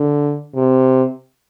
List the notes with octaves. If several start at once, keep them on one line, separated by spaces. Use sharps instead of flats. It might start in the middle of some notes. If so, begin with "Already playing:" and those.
Already playing: D3
C3